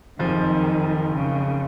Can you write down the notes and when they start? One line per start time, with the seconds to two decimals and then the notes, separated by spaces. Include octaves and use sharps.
0.19 F#1 F2 D#3 F3
1.14 C#3